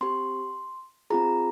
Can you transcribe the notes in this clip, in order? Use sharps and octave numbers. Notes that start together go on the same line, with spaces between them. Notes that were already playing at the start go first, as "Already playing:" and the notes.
C4 G4 C6
C4 F4 G#4 A#5